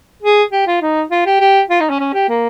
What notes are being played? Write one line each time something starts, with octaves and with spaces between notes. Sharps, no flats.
G#4
G4
F4
D#4
F4
G4
G4
F4
D#4
C#4
C#4
G4
A#3